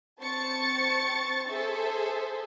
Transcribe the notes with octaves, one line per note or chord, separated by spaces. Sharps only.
C4 A5 C#6 A6 C#7
G#4 A4 C5 E5